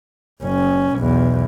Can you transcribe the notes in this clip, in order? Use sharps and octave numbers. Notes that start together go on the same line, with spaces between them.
F#1 C#4
B1 E2